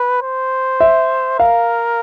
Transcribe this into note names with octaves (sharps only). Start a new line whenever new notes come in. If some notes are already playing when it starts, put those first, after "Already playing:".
Already playing: B4
C5
E5
A#4 F5